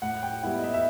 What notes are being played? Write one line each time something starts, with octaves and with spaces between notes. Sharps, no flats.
A2 F#5
G5
G3 B3 E4 F#5
D#5
E5
E5